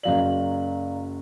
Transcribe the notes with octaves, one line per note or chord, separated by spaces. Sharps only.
F#1 F#3 D5 F5 F#7